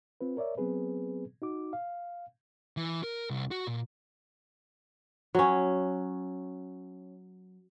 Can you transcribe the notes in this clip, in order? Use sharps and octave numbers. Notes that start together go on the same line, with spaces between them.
C4 F4 B4
A#4 C#5 D5 E5
F#3 B3 C4 G#4 B4
D#4 F#4 D6
F5
E3
A#4
C2
F#4
A#2
F#3 C#4